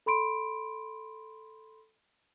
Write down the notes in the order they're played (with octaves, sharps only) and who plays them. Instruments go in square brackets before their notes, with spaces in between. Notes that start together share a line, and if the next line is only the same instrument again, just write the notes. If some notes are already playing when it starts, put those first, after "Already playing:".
[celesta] A4 B5 C6 D7